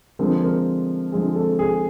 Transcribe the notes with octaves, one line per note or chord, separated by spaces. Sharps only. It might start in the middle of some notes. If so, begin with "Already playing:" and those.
D3 F3 G#3 C4 A#4
A#4
D3 F3 G#3 C4 G#4
A4
G#4